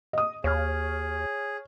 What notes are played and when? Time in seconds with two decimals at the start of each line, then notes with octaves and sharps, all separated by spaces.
0.13 D#5 D#6
0.44 D#2 G#4 C#5 F6